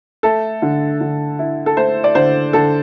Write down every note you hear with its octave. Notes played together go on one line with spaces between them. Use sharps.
A3 A4
D3
D3
E4
A4
A3 C5
D5
D3 C5
D3 A4